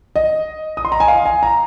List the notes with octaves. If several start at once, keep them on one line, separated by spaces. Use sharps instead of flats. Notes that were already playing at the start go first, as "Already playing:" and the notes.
D#5
D#6
C6
A#5
G#5
F5
G#5
A#5